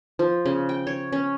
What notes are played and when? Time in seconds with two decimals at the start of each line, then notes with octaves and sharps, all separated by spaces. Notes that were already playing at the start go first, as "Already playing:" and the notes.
0.19 F3
0.45 C#3
0.69 G5
0.87 C#5
1.12 C#4